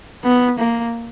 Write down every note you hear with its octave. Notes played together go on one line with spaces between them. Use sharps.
B3
A#3